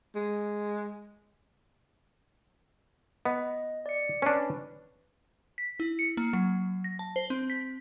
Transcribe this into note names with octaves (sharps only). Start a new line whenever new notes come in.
G#3
B3 D#5
D5 C#7
C#4 D4 B4
B6
E4
C#7
A#3
F#3
A#6
A5
C5
C4
B6